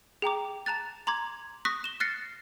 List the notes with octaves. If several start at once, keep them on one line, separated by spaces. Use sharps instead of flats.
G#4 G5 A#5 D6
A5 A#5 F#6 A6
A#5 C6 D6 G#6
C#6 D#6 F#6 A#6 B6
E7 G7
F6 F#6 A6 A#6 C7 C#7